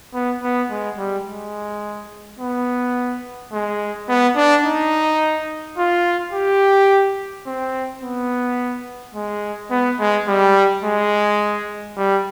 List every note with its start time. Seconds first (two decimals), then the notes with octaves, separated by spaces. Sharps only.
0.14 B3
0.43 B3
0.70 G#3
0.98 G3
1.27 G#3
2.40 B3
3.52 G#3
4.09 B3
4.36 D4
4.64 D#4
5.78 F4
6.33 G4
7.46 C4
8.02 B3
9.14 G#3
9.71 B3
10.00 G#3
10.28 G3
10.84 G#3
11.97 G3